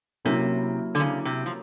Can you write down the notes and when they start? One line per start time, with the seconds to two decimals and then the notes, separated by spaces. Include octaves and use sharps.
0.25 C3 F#3 A#3 C#4 E4
0.95 D3
1.00 C#3
1.25 C3
1.46 F3